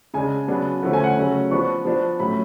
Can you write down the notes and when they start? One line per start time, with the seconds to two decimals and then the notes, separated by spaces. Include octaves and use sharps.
0.14 C#3 G#3 D4 G#5
0.48 C#3 F#3 B3 D4
0.82 D3 F3 A3 C#4 F#5
0.93 G#5
1.04 F#5
1.17 C#3 F#3 A3 C#4
1.51 F3 B3 D4 C#6
1.85 F3 B3 D4
2.20 A2 F#3 C#4 B5